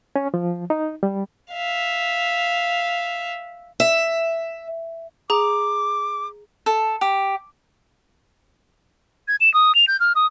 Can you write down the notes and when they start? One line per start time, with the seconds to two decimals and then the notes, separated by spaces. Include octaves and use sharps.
0.16 C#4
0.34 F3
0.70 D#4
1.03 G3
1.52 E5 F5
3.80 E5
5.30 G#4 A#5 D6
6.66 A4
7.01 G4
9.28 G#6
9.41 E7
9.54 D#6
9.75 F7
9.88 G6
10.00 F6
10.15 D#6